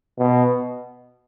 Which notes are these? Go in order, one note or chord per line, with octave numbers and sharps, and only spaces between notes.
B2